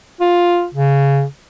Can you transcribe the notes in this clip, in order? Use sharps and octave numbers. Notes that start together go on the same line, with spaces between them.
F4
C#3